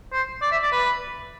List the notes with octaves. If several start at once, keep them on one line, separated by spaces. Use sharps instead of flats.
C5
D5
E5
D5
B4